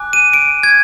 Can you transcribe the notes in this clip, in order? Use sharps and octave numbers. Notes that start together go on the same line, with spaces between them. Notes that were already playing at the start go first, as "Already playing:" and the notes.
Already playing: G#5 D6 F#6
D#7
D7
G#6